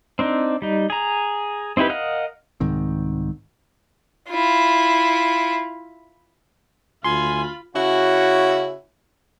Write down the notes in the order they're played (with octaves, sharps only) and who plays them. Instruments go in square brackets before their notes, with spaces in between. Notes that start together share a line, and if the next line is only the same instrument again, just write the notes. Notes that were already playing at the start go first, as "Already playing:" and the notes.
[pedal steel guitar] C4 D4 D#4
G3 D#4
G#4 A#5
C4 D#4 E4 G4 B4
A#4 D#5 F5 F#5
[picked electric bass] C2 G#2 D#3 C4
[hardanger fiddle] E4 F4
[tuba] D2 [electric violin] F4 B5 [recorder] G#5 [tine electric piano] C6
[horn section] C#3 C#4 E4 F#4